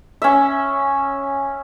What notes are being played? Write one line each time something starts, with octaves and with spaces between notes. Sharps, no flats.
C#4 E5